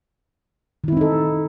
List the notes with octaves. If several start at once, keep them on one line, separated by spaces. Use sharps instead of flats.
D#3 C4 D#4 E4 A4